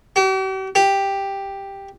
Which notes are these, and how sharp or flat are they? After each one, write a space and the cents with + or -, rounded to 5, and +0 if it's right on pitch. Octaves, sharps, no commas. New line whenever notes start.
G4 -45
G4 +5